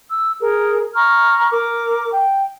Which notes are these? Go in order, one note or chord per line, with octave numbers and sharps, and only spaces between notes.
E6
G#4 A#4
A#5 C#6 F6
A#4 D6
G5